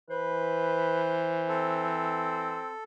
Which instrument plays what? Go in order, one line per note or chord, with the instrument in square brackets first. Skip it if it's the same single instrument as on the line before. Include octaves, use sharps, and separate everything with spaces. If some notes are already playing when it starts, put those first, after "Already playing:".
[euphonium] E3 [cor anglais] B4 [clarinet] C5
[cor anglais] C4 [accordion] A4